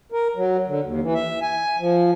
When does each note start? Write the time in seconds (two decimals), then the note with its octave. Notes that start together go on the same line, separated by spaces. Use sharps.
0.12 A#4
0.36 F#3
0.67 D3
0.84 D#2
1.02 E3
1.14 E5
1.42 G#5
1.79 F3